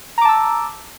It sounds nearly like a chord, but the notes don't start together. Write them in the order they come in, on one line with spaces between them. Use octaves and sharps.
A#5 D6 A5 E6